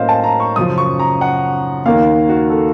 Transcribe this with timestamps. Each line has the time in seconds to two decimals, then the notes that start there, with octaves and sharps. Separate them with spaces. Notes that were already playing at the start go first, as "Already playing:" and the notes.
Already playing: A2 F#3 A#3 C#4 C5 D#5 F5
0.09 A5
0.24 A#5
0.40 C#6
0.56 F#2 C#3 F3 D#6
0.78 C#6
0.99 A#5
1.21 F#5
1.85 D#2 D#3 A#3 F5
2.29 F#4
2.49 A4